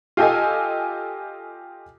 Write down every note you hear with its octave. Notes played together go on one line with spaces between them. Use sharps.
F4 G4 A4 D#5 G#5